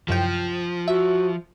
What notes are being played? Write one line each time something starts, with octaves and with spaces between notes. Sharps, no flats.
C2 F#2 F3 G5
F#4 E5